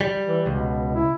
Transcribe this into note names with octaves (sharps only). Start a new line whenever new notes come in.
G3
E3
C#2 B2
E4